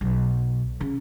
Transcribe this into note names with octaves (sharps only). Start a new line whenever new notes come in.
B1
C#3